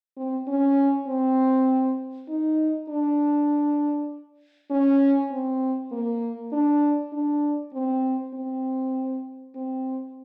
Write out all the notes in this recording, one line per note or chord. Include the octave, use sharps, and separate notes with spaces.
C4
C#4
C4
D#4
D4
C#4
C4
A#3
D4
D4
C4
C4
C4